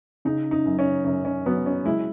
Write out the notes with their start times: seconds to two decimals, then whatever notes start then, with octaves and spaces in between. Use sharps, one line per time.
0.25 C#3 D#4
0.51 D#4
0.65 F#2
0.79 C#4
1.05 F#2 C#4
1.25 C#4
1.46 F#3 B3
1.66 C#4
1.85 G#3 E4